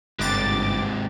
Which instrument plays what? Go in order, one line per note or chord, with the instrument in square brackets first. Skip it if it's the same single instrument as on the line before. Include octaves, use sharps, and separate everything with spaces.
[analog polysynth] G1 D6 A6 [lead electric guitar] G#2 C3